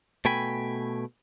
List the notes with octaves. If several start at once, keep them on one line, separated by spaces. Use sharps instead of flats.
B2 A3 G5 G#5 B5